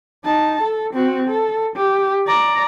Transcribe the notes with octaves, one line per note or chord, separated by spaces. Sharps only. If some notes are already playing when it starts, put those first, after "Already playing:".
D#4 A5
A4
C4 F#4
A4
G4
D5 A#5